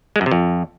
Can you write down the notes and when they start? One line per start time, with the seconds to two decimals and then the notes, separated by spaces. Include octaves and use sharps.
0.16 G#3
0.21 F#2
0.26 C3
0.31 F2